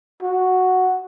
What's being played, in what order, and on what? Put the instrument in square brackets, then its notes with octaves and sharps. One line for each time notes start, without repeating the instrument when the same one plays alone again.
[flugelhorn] F#4